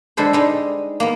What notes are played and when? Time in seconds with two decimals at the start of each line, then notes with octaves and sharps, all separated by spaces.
0.17 D3 G#3 A4 B4 C5
0.33 G3 G#3 D#4
1.00 A#3 B3